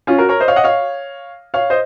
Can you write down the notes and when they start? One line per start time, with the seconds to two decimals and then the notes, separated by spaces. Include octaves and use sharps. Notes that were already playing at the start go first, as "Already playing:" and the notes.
0.07 C#4 F4
0.18 F#4 A#4
0.29 A#4 C#5
0.40 C5 D#5
0.48 C#5 F5
0.56 D#5 F#5
0.64 C#5 F5
1.54 C#5 F5
1.70 C5 D#5